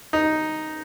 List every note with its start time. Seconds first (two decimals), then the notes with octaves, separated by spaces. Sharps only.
0.13 D#4